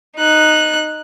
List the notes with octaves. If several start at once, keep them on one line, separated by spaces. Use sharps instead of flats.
D#4 F#6